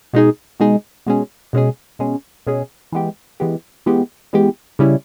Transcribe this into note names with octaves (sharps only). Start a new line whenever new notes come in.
B2 G#3 D#4 G#4
B2 G#3 D#4 G#4
B2 G#3 C#4 G#4
B2 G#3 C#4 G#4
B2 G#3 C#4 G#4
B2 G#3 C#4 G#4
E3 G#3 B3 G4
E3 G#3 B3 G4
E3 G#3 B3 G4
E3 G#3 B3 G4
C#3 G3 C#4 E4